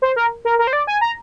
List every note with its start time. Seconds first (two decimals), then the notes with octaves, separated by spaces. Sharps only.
0.02 C5
0.16 A#4
0.45 A#4
0.59 A#4
0.67 C5
0.73 D5
0.87 G#5
1.01 A#5